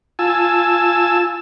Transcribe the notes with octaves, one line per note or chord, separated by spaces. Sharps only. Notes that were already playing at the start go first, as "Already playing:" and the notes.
F4 G#5 A5 E6